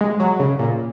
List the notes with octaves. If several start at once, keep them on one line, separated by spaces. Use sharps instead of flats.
G#3
F#3
C#3
A#2